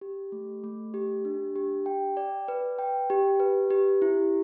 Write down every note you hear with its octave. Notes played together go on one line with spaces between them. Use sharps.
G4
A3
A3
G4
D4
G4
G5
D5
B4
G5
G4
B4
G4
E4